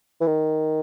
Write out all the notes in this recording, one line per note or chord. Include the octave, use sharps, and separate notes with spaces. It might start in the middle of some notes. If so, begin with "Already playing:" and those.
E3
D#3